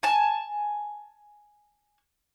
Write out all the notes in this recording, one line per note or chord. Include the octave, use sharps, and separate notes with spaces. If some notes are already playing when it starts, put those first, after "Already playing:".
G#5 A5